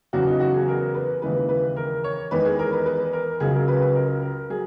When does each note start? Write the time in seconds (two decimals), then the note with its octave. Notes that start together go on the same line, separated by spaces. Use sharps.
0.13 E2 C#3 F#3 F#4
0.27 D#4
0.40 F#4
0.54 G#4
0.68 A#4
0.94 B4
1.22 D#2 C#3 E3 G#3 B4
1.49 B4
1.76 A#4
2.04 C#5
2.31 E2 D#3 G#3 B4
2.45 G#4
2.59 A#4
2.72 B4
2.86 B4
3.13 A#4
3.40 C#2 C#3 F#3 G#4
3.54 A#4
3.68 B4
3.81 B4
3.95 A#4
4.22 A#4
4.50 F#3 G#4